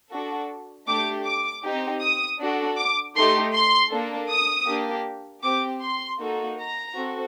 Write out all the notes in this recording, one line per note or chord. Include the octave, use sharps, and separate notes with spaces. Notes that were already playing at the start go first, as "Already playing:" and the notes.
D4 F#4 A4
A3 D4 G4 D6
D6
C4 D#4 G4
D#6
D4 F#4 A4
D6
A3 D#4 G4 C6
C6
A#3 D4 A4
D#6
A#3 D4 G4
C4 G4 D6
C6
A#3 D#4 F#4 A4
A#5
C4 F#4 A4